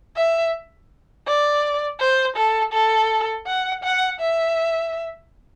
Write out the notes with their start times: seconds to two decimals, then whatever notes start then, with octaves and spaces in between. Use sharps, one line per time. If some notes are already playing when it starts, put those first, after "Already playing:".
0.17 E5
1.27 D5
2.00 C5
2.36 A4
2.73 A4
3.46 F#5
3.84 F#5
4.20 E5